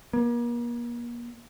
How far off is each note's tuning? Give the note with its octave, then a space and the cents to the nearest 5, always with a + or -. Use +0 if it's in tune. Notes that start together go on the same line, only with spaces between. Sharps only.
A#3 +40